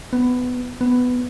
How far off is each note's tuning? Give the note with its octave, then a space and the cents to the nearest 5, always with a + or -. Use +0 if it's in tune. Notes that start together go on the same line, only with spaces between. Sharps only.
B3 +15
B3 +10